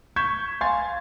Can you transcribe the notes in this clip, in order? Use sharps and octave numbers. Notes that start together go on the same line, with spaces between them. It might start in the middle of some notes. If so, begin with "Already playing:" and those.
C#6 G6 G#6 B6 E7
F5 G#5 C6 G#6 A6